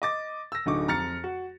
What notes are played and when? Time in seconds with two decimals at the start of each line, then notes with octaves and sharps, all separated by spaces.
0.02 D#5 D6 A6
0.52 E6 A#6
0.66 D1 D3 D#4 C#6 D6
0.88 F2 A#5 F6 A6 C#7
1.24 F#4